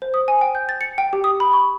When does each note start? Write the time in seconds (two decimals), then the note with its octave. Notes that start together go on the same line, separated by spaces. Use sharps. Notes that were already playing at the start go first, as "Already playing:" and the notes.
0.02 C5
0.14 D#6
0.28 G#5
0.41 G5
0.55 G6
0.69 A6
0.81 C#7
0.98 G5
1.13 G4
1.24 D#6
1.40 B5
1.53 C#6